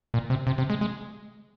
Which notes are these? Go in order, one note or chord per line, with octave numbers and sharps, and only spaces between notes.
A#2
C3
C3
C3
G#3
G#3